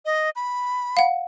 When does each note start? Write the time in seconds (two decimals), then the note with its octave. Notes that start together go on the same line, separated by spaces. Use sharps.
0.05 D#5
0.36 B5
0.97 F5 F#5